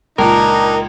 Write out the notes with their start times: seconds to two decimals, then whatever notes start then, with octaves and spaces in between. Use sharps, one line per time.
0.18 C#2 A#2 D4 D#4 A#4